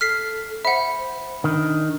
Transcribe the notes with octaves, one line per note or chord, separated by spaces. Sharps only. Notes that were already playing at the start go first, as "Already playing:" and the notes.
A4 F6 B6 C7
C5 E5 F#5 B5
D#3 D4